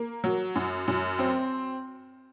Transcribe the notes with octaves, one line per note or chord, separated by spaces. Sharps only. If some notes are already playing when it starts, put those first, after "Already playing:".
Already playing: A#3
F#3
F#2
F#2
C4